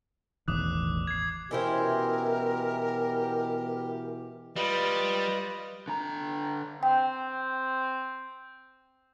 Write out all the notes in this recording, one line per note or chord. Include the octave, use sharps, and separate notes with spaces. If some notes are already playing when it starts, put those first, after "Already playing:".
E1 A1 D#3 D6 D#6 F#6
G#6 C7
B2 E3 C#4 E4 G4 A#4 C5
G3 F4 B4 D#5
D3 A#5
C4 G5